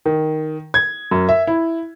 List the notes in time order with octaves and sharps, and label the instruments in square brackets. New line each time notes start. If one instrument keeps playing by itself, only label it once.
[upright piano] D#3
G#6
F#2
E5
E4